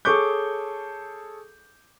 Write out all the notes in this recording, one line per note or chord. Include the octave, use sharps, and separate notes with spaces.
G#4 A4 C#5 C#6 D6 G6